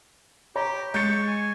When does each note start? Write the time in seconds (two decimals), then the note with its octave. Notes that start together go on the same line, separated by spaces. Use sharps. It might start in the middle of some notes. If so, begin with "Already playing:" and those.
0.56 G4 C#5 A#5
0.94 G#3 C#6 G6 A6 C#7
1.27 G#5